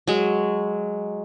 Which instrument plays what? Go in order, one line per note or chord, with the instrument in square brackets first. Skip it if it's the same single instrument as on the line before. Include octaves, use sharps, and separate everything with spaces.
[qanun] F#3 G#3